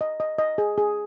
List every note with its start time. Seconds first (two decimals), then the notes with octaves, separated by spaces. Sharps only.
0.01 D#5
0.20 D#5
0.38 D#5
0.58 G#4
0.78 G#4